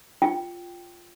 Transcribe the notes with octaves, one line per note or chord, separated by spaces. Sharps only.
F4 G5